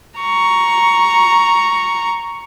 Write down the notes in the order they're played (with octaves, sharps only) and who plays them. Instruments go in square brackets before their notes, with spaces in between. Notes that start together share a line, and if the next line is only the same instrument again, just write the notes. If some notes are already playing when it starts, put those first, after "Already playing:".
[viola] A#5 C#6